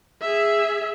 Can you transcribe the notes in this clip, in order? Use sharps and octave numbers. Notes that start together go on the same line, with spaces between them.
G#4 E5